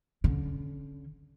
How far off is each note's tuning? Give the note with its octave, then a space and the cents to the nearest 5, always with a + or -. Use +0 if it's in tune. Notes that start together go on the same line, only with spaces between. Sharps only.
D3 -30 C#4 -20